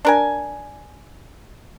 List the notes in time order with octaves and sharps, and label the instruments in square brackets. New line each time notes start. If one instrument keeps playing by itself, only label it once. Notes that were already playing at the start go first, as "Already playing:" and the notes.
[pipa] D4 A#4 G#5